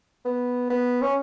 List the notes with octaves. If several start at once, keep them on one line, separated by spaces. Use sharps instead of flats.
B3
B3
C#4